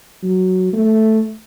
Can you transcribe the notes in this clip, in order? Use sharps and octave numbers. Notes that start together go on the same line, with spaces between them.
F#3
A3